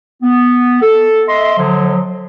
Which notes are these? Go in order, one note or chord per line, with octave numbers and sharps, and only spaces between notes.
B3
A4
D#5 E5 C6
D3 F3 F#3